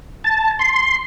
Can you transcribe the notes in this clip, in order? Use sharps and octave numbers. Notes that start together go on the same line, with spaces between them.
A5
C6